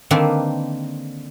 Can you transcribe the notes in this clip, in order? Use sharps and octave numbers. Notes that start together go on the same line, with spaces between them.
D3 D#3 A#3 C4 D4 B4